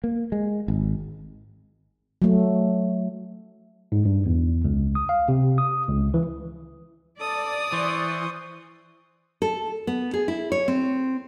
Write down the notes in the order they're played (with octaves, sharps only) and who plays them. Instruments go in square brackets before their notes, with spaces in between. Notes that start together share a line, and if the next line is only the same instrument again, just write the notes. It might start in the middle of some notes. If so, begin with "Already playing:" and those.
[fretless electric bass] A#3
G#3
G#1
[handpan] F#3 A3
[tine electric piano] G#2
G2
E2
C#2
D#6
F5
C3
D#6
C#2
E3
[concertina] A4 [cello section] D5 [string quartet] D#6
[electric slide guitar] E3 [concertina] C5 C6 C#6
[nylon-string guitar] A4
B3
G#4
E4
C#5
C4